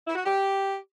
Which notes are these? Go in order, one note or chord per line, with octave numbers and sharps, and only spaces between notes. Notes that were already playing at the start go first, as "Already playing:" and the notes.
E4
F#4
G4